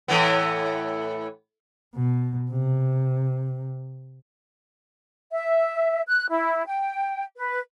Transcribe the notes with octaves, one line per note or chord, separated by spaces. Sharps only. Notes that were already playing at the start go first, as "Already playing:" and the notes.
A2 E3 B3
B2
C3
E5
F#6
E4
G5
B4